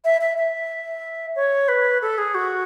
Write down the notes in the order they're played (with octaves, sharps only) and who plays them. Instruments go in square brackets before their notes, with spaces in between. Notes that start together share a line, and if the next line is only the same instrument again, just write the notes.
[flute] E5
E5
E5
C#5
B4
A4
G#4
F#4